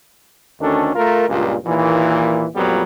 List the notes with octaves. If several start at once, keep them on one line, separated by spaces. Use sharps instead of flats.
D2 D#3 C#4 D4 A4
A3 F4 A#4
C#2 G2 A#2
D#2 A#2 E3
F2 A#2 F#3 G3 B3